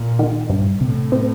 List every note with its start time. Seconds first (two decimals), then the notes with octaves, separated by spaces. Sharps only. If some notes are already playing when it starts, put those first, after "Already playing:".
Already playing: A#2
0.19 D#3
0.50 G2
0.81 A2 C3
1.12 C4